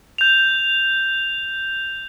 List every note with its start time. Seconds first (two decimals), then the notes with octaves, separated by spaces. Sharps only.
0.18 G6 F7